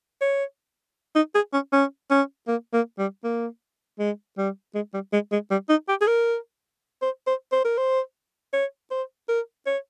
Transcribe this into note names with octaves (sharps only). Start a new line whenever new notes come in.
C#5
D#4
G#4
C#4
C#4
C#4
A#3
A#3
G3
A#3
G#3
G3
G#3
G3
G#3
G#3
G3
D#4
G4
G#4
A#4
C5
C5
C5
A#4
C5
C#5
C5
A#4
C#5